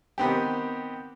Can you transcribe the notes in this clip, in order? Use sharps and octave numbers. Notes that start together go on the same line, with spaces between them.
D#3 B3 C4 G4